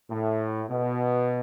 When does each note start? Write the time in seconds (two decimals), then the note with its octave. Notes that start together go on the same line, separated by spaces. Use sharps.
0.10 A2
0.70 B2